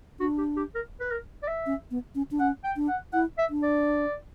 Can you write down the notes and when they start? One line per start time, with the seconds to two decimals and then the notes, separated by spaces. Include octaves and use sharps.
0.20 D4 F#4
0.38 G4
0.56 G4
0.75 A#4
1.00 B4
1.11 A#4
1.43 D5
1.48 E5
1.66 C#4
1.91 B3
2.15 C#4
2.31 D4
2.40 C#4 F#5
2.64 G5
2.76 D4
2.88 F#5
3.13 E4 F#5
3.38 E5
3.50 D4
3.63 D5